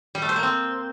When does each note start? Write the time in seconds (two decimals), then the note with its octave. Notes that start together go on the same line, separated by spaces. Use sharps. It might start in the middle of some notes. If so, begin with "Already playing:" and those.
0.15 G3
0.22 A3
0.29 C5
0.36 A#3
0.43 C4